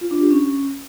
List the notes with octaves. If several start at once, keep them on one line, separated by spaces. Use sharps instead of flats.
F4
D4
G4
C#4